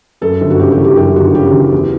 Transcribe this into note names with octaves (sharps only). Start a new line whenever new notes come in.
F#2 A4
G1
F#4
C#3 G4
G4
E3
G4
F#2 G4
G1 F#4
C#3 G4
E3
E2